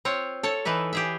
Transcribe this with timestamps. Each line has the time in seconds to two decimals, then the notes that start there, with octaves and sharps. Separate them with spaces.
0.05 C4 F4 C#5
0.43 A4 C#5 A5
0.65 E3 D#4 B4 E5
0.93 G4 G#4 E5